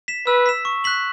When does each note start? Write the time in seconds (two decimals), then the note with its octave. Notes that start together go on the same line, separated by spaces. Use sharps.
0.08 B6 E7
0.27 B4 E6
0.46 B6 E7
0.65 C#6
0.84 F#6 B6 F#7